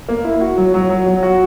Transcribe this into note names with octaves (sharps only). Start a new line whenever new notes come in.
A#3
E4
F#4
F#3
F#3
F#3
F#3
F#4